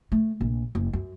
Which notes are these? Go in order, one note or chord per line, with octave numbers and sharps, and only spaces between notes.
A3
A#1
F#1
F#2